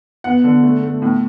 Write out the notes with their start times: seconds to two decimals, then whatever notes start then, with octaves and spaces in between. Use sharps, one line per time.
0.24 B3 F#5
0.44 D3
0.63 A3
0.83 A3
1.02 A2